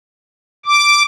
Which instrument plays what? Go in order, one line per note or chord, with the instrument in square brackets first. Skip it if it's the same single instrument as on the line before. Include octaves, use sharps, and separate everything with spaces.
[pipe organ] D6